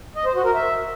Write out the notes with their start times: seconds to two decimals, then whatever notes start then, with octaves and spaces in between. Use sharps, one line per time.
0.16 D#5
0.26 C5
0.35 F#4
0.45 A#4
0.54 E5